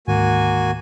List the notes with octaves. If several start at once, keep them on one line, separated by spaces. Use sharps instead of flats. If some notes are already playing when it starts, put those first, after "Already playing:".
D2 G#2 D#3 A#3 F#4 G#5